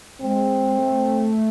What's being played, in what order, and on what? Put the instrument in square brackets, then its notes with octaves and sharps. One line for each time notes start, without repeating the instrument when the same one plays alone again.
[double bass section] G#3 [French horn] C4
[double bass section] A3